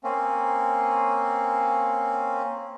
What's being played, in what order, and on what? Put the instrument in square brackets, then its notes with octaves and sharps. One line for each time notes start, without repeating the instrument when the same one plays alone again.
[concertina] A#3 C4 C#4